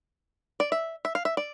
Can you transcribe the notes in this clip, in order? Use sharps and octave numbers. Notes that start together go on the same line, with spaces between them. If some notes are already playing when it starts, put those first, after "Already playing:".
D5
E5
E5
F5
E5
D5